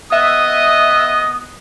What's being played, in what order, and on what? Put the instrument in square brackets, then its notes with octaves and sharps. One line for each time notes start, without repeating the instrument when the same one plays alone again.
[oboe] B3 [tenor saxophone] D#5 [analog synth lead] E5 [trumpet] D#6